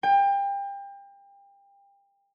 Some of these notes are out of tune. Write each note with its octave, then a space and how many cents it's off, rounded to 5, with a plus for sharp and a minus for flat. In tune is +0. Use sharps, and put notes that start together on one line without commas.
G5 +30